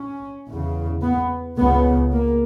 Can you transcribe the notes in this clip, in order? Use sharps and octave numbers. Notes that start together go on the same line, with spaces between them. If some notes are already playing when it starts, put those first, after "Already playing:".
Already playing: C#4
E2 C#3
B3
C#2 C#3 B3
A#3